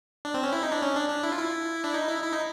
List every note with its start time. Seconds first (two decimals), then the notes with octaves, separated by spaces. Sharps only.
0.25 D4
0.34 C4
0.43 C#4
0.53 E4
0.63 D#4
0.72 D4
0.82 C#4
0.96 D4
1.09 D4
1.23 E4
1.32 F4
1.39 E4
1.84 D4
1.94 D#4
2.09 E4
2.23 E4
2.33 D#4